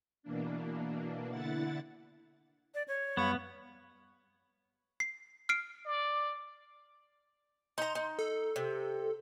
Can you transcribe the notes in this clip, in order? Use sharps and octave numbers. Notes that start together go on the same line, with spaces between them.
B2 E3 A#3 D4
D3 E4 F#5 A6
D5
C#5
F#2 G3 B3 F5 B5 C#6
C7
F6 C7 D7
D5
D#4 A#5 C6
D#4
A4
C3